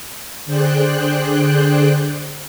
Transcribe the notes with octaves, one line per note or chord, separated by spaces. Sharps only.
D3 G#4 C5 D5 G5 F#6